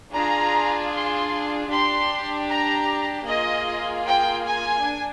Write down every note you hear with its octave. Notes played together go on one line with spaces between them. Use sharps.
D4 F4 G#4 A#5
C6
D4 G4 C6
A#5
A#3 F4 G#4 D#5
G5
G#5
D4